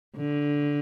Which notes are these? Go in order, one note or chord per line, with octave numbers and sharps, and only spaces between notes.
D3